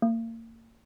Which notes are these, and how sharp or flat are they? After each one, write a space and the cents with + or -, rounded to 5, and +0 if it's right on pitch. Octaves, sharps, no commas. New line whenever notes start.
A#3 -35